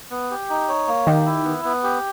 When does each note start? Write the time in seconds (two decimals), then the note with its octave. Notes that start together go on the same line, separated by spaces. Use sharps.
0.11 B3
0.31 G4
0.50 D#4
0.68 C#5
0.88 A#3
1.07 D#3 G4
1.26 E4
1.45 B3
1.65 B3
1.83 G4